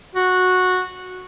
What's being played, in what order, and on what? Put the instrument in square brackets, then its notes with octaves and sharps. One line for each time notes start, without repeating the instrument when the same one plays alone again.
[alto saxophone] F#4